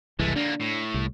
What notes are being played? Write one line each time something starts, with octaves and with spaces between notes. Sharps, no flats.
F#1 C2 E3 G#3 A3
D3 A#3 D4
A2
C2